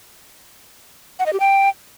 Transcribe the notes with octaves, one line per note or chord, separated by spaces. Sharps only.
F#5
D#5
G4
G5